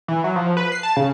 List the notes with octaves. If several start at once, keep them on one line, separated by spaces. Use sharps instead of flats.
E3
F#3
F3
B4
C7
A5
C#3